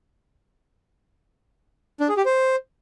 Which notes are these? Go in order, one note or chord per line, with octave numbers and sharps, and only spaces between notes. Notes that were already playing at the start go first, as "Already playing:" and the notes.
D4
G#4
G4
C5